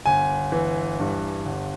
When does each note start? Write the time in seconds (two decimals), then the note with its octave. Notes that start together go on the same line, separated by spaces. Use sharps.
0.06 G1 G#5
0.52 E3
1.00 G2
1.46 G1